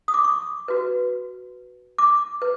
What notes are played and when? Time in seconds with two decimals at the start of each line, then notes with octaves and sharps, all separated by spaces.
0.08 D#6
0.14 D6
0.24 C#6
0.68 F#4 B4
1.98 D6
2.42 B4